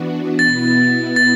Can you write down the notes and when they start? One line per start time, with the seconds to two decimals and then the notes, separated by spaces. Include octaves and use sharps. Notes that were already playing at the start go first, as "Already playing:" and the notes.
Already playing: E3 B3 D4 F#4
0.39 B2 B3 E4 A6
1.16 A6